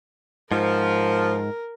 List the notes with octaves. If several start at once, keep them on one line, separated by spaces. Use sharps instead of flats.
G#2 F3 A#4